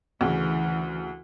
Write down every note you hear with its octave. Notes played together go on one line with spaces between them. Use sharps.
D2 C#3 E3